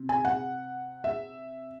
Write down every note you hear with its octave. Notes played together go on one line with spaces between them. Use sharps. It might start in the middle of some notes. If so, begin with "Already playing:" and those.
Already playing: C3
G#5
F#5
E5